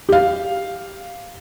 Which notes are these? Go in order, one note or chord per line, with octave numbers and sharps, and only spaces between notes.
G4 F5